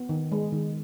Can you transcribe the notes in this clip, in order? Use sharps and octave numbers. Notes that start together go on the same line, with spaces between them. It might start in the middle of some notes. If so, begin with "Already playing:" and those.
Already playing: B3
D#3
G#3
D#3